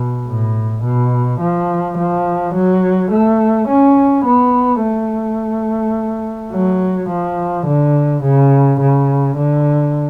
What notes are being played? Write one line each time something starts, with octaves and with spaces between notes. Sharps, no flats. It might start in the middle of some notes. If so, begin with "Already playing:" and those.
Already playing: B2
A2
B2
F3
F3
F#3
A3
C#4
B3
A3
F#3
F3
D3
C#3
C#3
D3